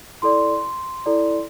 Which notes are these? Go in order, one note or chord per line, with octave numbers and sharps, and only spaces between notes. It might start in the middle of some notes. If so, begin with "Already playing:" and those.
E4 A4 D5 C6
E4 A4 D5